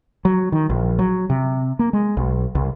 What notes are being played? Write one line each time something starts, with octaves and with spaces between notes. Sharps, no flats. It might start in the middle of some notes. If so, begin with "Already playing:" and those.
F#3
D#3
A#1
F#3
C3
A#3
G#3
B1
C2